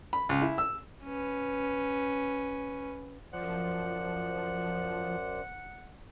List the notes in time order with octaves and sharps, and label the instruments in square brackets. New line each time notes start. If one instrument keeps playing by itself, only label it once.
[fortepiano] B5
C#2
E4
E6
[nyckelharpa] C#4 B4
[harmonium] F#2 C5 D5 [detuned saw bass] F3 [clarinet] F#5